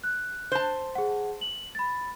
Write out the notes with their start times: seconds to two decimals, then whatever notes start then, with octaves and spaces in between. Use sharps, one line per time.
0.04 F#6
0.52 C5 A5
0.95 G#4 F#5
1.41 F#7
1.75 B5 A6